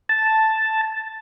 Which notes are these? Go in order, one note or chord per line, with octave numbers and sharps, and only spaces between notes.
A5